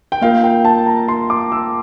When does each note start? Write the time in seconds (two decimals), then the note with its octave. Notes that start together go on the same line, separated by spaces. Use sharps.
0.12 G5
0.22 A#3 F4 A#4 F5
0.44 G5
0.65 A5
0.87 A#5
1.08 C6
1.30 D6
1.52 E6